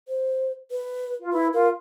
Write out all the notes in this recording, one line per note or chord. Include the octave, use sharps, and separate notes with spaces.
C5
B4
F4
E4 B4
F4 A#4